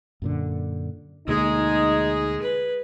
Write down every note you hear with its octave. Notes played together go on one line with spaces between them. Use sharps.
F#2 A#2 D3
D2 B2 G#3 A#3 D#4 G#4
B4